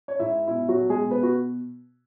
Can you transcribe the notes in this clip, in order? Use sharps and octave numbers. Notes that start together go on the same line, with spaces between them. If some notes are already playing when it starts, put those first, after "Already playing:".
C#5
G#2 E4 E5
B2 E4
F#3 F#4
B2
G#3 G#4
B2
B3 B4
F#4